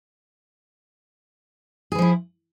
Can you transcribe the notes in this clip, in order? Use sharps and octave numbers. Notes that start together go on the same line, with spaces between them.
E3 F3 E4 G#4